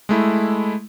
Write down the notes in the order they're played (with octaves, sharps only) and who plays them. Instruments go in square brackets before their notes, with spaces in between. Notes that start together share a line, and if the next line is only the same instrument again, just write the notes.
[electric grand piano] G#3 A3 E4